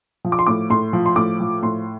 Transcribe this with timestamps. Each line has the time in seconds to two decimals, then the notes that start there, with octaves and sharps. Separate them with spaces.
0.25 F3
0.32 D6
0.39 C6
0.47 A2 D6
0.70 A2 C6
0.93 F3
1.06 C6
1.16 A2 D6
1.40 F3
1.63 A2 C6